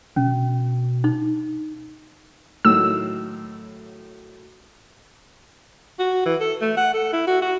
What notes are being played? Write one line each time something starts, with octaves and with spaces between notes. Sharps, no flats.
B2 C#4
D#4
A2 D#3 F#3 E6
F#4
E3
A4
A3
F#5
A4
E4
F#4
F#4